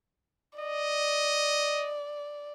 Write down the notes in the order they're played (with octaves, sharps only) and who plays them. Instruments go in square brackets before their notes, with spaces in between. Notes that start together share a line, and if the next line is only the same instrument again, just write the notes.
[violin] D5 [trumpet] D#5